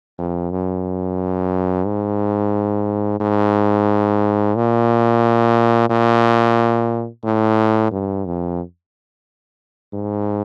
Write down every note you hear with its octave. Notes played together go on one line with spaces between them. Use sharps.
F2
F#2
G#2
G#2
A#2
A#2
A2
G2
F2
G#2